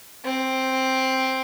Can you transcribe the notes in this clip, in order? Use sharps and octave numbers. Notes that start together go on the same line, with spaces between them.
C4